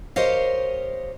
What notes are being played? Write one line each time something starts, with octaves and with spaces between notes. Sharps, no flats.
G4 A#4 C5 C#5 D#5 F5